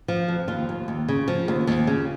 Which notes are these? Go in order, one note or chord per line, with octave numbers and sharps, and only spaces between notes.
F3
F2
D#2 F4
D#2
D#2
C#3
F3
D#2
D#2
C#3